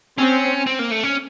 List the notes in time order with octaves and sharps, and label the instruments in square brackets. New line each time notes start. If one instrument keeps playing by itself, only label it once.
[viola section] C4 [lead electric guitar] C#4
[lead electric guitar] C4
A#3
A3
C#4